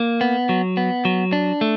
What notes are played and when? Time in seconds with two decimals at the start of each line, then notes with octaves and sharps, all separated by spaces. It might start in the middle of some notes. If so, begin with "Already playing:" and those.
Already playing: A#3
0.21 B3
0.49 F#3
0.77 B3
1.05 F#3
1.33 D4
1.61 A3